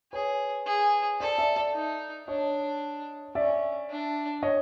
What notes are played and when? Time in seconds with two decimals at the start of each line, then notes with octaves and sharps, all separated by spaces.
0.13 G#4 B4 C#5
0.67 G#4
1.20 A4 C5 D5
1.38 D5 E5
1.56 D5 E5
1.74 D#4
2.28 D4 C#5 D#5
3.35 C#4 D5 E5
3.90 D4
4.43 C#5 D#5